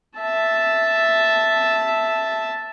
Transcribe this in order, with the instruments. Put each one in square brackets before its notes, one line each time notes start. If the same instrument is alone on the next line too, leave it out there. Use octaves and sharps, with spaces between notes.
[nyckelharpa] E5 A5